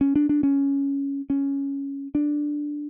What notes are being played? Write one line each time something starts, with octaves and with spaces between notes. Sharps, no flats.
C#4
D4
D4
C#4
C#4
D4